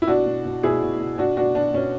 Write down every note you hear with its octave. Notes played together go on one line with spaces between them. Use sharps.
E4
B2 D4 F#4
B2
B2
B2 E4 G#4
B2
B2
B2 D4 F#4
B2 D4 F#4
B2 D4
B2 C#4